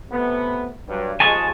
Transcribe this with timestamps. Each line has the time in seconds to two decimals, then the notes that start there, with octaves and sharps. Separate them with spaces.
0.10 C3 A3 B3
0.87 G2 F#3
1.20 D#2 F3 G#3 G#5 A5 C#6